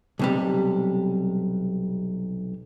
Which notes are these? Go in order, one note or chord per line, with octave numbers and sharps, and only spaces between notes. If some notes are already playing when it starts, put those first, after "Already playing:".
B1 C3 G3